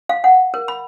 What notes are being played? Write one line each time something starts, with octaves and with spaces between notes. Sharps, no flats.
F5
F#5
A#4
B5